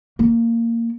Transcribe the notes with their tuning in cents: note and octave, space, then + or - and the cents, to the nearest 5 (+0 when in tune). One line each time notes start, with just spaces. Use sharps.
A#3 -15